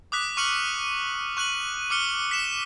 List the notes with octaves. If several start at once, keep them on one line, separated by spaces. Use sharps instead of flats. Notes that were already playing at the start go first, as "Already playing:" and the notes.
D6 D#6 F#6 B6
C#6 F6 C#7 D#7 F#7
C#6 F#6 D#7 F#7
D6 F6 C#7 G7
B6 E7